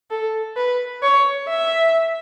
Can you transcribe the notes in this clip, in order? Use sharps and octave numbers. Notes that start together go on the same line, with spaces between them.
A4
B4
C#5
E5